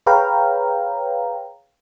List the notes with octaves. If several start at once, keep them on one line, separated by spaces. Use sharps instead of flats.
G#4 B4 C#5 F5 G5 A#5